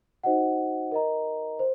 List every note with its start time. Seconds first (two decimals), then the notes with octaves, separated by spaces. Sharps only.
0.24 D#4 F#4 C5 D#5 F#5
0.92 A#4 D#5 A#5
1.59 C5